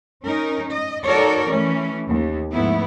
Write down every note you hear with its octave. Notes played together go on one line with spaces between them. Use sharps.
C#4 D#4 A#4
D#5
D#4 F#4 A4 A#4 C#5 D5
E3 A3 C#4
D#2
G#2 F3 A3 B3 E4